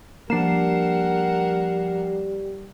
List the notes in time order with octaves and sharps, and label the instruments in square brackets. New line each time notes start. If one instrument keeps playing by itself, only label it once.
[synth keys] F3 C7 E7 [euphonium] G3 [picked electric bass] A#3 D4 [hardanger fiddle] A#4 F#5